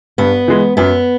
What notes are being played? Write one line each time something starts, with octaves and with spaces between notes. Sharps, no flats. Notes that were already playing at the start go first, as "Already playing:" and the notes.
G2 B3
E3 G#3
F#2 B3